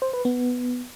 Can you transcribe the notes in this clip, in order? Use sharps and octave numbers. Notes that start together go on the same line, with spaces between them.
C5
B4
B3